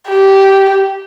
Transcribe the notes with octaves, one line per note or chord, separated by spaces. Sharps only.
G4